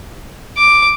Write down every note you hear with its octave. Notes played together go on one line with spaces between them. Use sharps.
D6